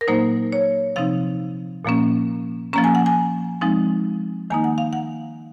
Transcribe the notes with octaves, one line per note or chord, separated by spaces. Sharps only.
A#4
A#2 F#3 A#3 D#4 C5
C#5
C3 F3 C4 D#4 F5
A#2 F3 A#3 C#4
F3 A#3 C#4 A#5
G#5
F#5
G#5
F3 G#3 C4 D#4
D#3 A#3 D#4 G#5
F#5
F5
F#5